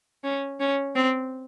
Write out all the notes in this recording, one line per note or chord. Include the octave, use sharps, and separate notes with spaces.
C#4
C#4
C4